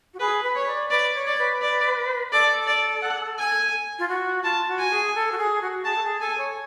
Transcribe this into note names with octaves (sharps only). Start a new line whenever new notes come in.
F#4
G#4 B4
B4
C#5
D5
B4 D5
C#5
D5
B4
D5
A4 D5
D5
F#5
G#5
F4
F#4
F4 A5
F#4
G#5
G#4
A4
F#4
G#4
F#4
G#4 A5
A4
G#4
A4 G#5
C#5